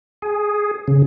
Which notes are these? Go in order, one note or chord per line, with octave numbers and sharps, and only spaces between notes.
G#4
C#3